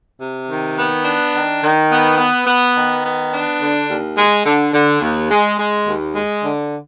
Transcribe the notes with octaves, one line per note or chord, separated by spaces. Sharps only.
C3
D#3
B3
D4
D#3
D#3
B3
B3
B3
D#3
B3
D4
D3
D#2
G#3
D3
D3
D#2
G#3
G#3
D#2
G#3
D3